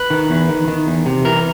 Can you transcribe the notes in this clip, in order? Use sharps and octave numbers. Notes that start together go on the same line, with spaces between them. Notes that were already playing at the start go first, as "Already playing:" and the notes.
Already playing: B4
D#3
E2
D#3
D#3
E2
C3
E3 A#4